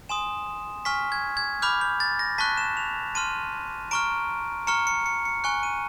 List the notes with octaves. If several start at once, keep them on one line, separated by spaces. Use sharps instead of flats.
G#5 C6 D#6 E7
G#5 C#6 F6 B6
G#6
G#6
B5 D6 F6 G6
G6
A6
A#6
A5 C#6 F#6 B6
E7
F7
A5 C6 F6 D#7
A#5 C#6 F6 D7
A#5 C#6 F6 C#7
C#7
C#7
C#7
G#5 C#6 F#6 C#7
D#7